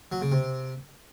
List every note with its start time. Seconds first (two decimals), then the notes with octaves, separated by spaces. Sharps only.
0.12 F#3
0.22 C#3
0.32 C3